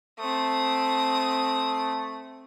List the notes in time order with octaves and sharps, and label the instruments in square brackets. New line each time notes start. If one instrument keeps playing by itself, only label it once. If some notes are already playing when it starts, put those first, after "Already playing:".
[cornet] A3 [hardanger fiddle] C4 D#6